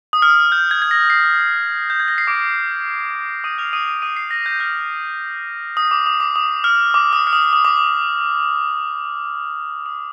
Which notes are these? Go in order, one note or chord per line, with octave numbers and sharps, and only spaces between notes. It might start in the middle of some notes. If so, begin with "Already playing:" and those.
D#6
F6
G6
G#6
G#6
A#6
C7
G6
G#6
A#6
C7
D6 D7
D#6 D#7
F6 F7
D#6 D#7
D#6 D#7
D#6 D#7
C7
A#6
G6
F6
D#6
D6
D#6
D6
D#6
F6
D6
D#6
F6
D#6
D#6
D6
D#6
D#6